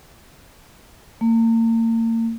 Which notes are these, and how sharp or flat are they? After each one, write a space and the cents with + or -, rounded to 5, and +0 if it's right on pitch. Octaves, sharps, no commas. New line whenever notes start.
A#3 -40